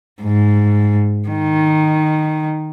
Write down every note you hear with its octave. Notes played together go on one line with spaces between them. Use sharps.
G#2
D#3